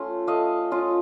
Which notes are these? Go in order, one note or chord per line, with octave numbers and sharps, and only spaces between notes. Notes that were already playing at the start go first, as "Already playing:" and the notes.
Already playing: A3 C#4 F4
A3 D#5 F5
C#4 F4